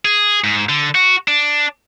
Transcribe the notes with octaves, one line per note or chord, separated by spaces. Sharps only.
G#4
G#2
D3
F#4
D4